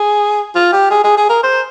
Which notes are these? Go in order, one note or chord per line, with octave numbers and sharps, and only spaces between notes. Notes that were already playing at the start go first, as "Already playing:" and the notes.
Already playing: G#4
F4
G4
G#4
G#4
G#4
A#4
C5